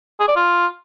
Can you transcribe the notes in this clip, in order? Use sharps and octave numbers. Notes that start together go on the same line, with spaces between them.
G#4
D5
F4